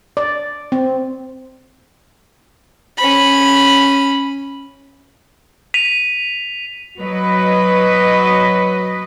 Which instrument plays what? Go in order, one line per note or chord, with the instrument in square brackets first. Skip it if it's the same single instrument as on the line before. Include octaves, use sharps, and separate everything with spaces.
[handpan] D5
C4
[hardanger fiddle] C#4 B5
[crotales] B6 D#7 F7
[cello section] F#3 B4 D#5